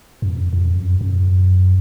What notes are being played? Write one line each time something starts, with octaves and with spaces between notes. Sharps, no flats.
F#2
F2
F2
F#2
F#2